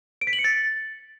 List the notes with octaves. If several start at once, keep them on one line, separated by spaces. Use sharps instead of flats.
D7
B6
F#7
C#7
A6